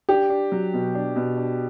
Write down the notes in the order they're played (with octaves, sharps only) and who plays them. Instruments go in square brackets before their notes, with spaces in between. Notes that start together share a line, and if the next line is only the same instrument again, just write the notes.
[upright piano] D4 [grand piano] G4
[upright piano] D4
F#3
B2
D4
B2
D4